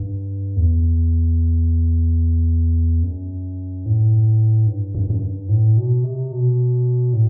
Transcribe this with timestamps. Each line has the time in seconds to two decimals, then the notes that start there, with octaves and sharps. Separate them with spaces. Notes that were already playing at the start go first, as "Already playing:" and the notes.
Already playing: G2
0.57 E2
3.03 F#2
3.86 A2
4.67 G2
4.95 F#2
5.10 F#2
5.21 G2
5.49 A2
5.77 B2
6.04 C3
6.32 B2
7.13 A2